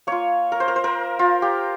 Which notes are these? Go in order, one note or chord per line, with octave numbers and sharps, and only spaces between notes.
A#3 F4 C#5
A#4
C5
A#4
C5
A#4
F4
G4